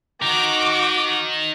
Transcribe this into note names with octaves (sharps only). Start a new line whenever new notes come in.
D#4 F#4 A#4 D6